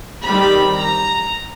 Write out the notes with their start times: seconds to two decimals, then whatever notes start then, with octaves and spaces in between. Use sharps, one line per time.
0.24 D#3 G3 C4 B5
0.78 A#5